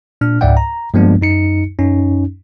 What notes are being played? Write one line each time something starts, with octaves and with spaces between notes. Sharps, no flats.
A#2 D4 F6
C#2 G#2 D5 E5 F#5 G5
A#5
G2 F3 G#3 A#3 B3 D4
F#2 D#4 C#7
F#2 C#4 D#4